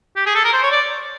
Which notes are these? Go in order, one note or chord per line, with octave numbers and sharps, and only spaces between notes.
G4
G#4
A4
A#4
C5
C#5
D5